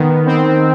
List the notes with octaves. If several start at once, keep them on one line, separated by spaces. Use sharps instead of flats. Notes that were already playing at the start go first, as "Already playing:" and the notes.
Already playing: D#3 B3
C4